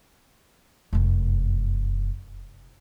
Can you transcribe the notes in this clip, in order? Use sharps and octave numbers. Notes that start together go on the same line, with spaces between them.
F1 F#2